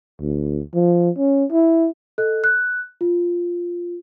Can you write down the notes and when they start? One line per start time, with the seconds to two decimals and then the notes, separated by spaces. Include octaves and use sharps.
0.21 D2
0.74 F3
1.18 C#4
1.52 E4
2.18 A4 D#5 F#6
2.44 F#6
3.01 F4